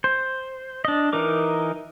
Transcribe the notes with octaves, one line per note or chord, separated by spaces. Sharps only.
C5
D4 D#5
E3 D#4 A#4 D6